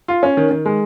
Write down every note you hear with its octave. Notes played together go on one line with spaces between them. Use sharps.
F4
C#4
D#3
D#3
G#3